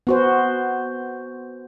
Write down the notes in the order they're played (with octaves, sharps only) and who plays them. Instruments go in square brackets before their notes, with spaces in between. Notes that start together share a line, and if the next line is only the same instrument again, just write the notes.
[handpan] B3 F#4 C5